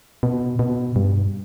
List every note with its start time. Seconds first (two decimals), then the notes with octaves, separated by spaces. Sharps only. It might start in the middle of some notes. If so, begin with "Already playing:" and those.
0.23 B2
0.59 B2
0.96 G2